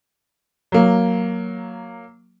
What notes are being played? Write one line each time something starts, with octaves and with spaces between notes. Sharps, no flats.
F#3 A#3